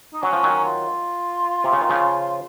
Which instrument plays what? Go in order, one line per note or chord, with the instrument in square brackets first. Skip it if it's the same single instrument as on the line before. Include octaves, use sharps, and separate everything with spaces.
[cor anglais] D#4
[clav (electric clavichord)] F#3 [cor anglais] C#4
[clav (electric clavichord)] F3
D#3 F#3
[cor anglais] F4
[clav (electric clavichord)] C3
C#3
D#3
C#3 F3